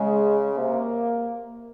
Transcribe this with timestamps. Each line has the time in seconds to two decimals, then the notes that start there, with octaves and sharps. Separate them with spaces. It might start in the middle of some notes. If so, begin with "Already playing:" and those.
Already playing: C#3 G#3
0.57 C3 A#3